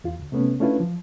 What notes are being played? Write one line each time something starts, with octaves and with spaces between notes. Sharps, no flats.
E2 F4
D2
C3 A3 B3 C#4
A3 C#4 D4 E4 F4 B4
F3